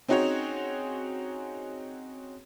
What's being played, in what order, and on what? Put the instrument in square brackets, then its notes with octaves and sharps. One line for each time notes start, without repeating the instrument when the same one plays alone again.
[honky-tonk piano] C4 C#4 D#4 F#4 G#4 C#5